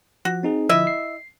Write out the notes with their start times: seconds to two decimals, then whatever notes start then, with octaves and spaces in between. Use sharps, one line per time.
0.25 F3 F#4
0.43 C4 D#4 G#4
0.69 D3 F3 E4 D#5 E5
0.87 C7